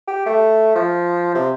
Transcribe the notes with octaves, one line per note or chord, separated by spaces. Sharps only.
G4
A3
F3
C3